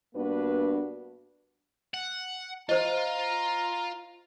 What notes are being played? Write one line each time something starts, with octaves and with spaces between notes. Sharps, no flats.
G2 A#3 B3 D4 F#4 B4
F#5
F4 C5 D#5 A#5